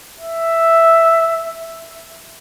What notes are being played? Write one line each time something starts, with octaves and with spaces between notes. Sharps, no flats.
E5